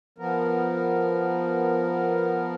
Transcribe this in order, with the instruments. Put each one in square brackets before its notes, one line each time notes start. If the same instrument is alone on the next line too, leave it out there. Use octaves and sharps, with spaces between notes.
[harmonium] F3 B3 A#4